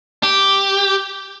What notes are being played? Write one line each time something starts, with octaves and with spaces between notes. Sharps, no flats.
G4